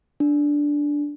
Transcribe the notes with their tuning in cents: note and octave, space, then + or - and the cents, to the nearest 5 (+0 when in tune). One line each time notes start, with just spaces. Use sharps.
D4 -5